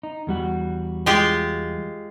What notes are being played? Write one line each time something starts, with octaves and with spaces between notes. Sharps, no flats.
D#4
E2 G3 F#4
G#3 F4 G4